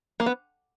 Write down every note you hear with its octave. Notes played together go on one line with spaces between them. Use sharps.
A#3
B3